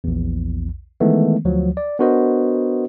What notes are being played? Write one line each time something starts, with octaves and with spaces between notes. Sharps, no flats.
A#1 E2
D#3 E3 G#3 A3 B3
D2 F3 F#3
D5
B3 D4 F#4 A#4 C5 D#5